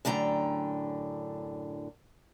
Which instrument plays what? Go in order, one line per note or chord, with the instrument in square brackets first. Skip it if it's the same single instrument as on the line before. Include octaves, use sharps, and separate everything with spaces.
[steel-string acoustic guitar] F#2 A2 D3 G5 A#5